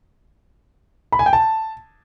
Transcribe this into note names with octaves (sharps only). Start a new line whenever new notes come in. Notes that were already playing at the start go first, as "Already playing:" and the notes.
B5
G#5
G5
A5